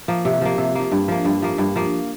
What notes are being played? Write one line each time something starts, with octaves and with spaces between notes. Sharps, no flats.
F3 A#3
C3
F3 A#3
C3
F3 A#3
G2
F3 A#3
G2
F3 A#3
G2
F3 A#3